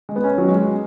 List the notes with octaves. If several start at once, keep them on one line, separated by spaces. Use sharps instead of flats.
G#3
B3
C#4
F#3
G#3